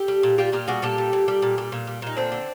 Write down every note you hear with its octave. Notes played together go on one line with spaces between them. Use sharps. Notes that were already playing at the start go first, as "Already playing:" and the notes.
Already playing: G4 A4
G3
A#2
G3 F4 G4
A#2 F4 G4
G3 F#4 G#4
A#2 G4 A4
G3
A#2
G3
A#2
G3
A#2
G3
A#2 D#4
D3 C4 D4
D3